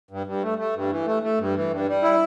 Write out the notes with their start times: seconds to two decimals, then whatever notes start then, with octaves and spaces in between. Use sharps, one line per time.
0.11 G2
0.27 G2
0.43 A3
0.58 A3
0.75 G2
0.90 E3
1.06 A3
1.23 A3
1.39 G2
1.56 E3
1.71 G2
1.87 G3
2.03 E4